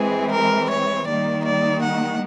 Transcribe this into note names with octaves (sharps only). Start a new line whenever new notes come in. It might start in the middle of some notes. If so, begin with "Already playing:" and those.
Already playing: E3 G#3 C4 G#4
A#4
C#5
D#3 G3 A#3 D#4 D5
D5
F#5